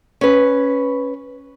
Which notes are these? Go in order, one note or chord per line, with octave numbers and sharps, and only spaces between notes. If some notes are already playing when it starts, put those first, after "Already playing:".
C#4 B4